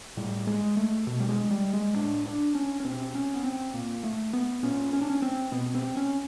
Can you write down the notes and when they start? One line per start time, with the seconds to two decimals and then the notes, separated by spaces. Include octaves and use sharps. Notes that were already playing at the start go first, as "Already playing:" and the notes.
0.17 A2 G3
0.47 G#3
0.77 A3
1.07 B2
1.20 G3
1.29 G#3
1.51 G3
1.73 G#3
1.95 A2 D4
2.26 D4
2.55 C#4
2.80 C#4
2.84 B2 C4
3.15 C#4
3.34 B3
3.44 C4
3.74 A#2 A#3
4.03 A3
4.33 B3
4.63 A#2 C#4
4.93 C#4
5.01 D4
5.10 C#4
5.22 C4
5.52 B2 B3
5.75 C4
5.97 C#4